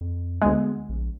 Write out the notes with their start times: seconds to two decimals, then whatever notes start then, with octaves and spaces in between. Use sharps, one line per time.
0.01 F2
0.42 D2 G#3 B3
0.89 A#1